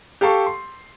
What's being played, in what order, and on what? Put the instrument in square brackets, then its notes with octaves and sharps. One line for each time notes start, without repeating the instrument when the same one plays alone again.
[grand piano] G4 A4 F5 A5 C#6
C6